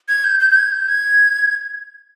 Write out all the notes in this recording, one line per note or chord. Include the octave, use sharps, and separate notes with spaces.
G#6
G6
G6
G6
G#6
G6
G#6